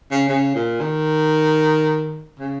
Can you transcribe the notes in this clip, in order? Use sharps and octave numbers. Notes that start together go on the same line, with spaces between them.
C#3
C#3
A#2
D#3
C#3